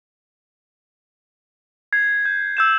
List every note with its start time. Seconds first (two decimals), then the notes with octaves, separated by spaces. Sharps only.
1.93 G#6 C7
2.25 G6
2.57 E6 G6 E7